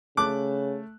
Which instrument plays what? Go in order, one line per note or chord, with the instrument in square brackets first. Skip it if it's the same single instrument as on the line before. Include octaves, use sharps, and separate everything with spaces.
[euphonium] C#3 [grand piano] A3 A5 F#6 [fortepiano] D6